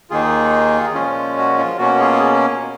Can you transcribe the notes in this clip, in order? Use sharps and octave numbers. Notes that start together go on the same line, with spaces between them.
D#2 D#3 A#3 D#4 F4 G#4
A#2 F3 G#3 C#4 F4
F#4
F4
B2 A#3 C#4 F#4
F4 G#4